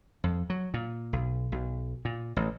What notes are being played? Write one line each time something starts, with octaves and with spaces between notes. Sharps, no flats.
F2
F#3
A#2
B1
B1
A#2
A1